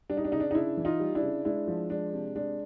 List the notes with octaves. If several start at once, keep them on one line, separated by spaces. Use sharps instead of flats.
G3 D4
D#4
D4
C#3 D#4
D4
D#4
C#3 D4 E4
E3
D#4 F4
G3
D4 E4
C#3
G#3 D4 E4
F3
G#3 D4
C3
G#3 D4